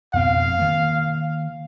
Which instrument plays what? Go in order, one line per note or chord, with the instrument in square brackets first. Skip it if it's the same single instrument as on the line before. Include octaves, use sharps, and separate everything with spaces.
[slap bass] F2 B2 C4 [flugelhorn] F5
[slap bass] D#3 A#3